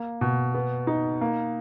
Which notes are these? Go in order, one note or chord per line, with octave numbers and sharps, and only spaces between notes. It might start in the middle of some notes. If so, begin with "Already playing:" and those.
Already playing: A#3
B2
B3
D#4
A#3